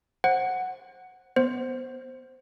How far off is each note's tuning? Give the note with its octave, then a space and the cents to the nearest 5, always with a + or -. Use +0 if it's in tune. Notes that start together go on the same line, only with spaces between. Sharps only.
C5 +25 F#5 +0
B3 -5 C5 +0